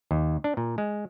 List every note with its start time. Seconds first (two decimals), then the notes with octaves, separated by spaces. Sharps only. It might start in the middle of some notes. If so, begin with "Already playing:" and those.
0.11 D#2
0.44 D4
0.57 A#2
0.78 G#3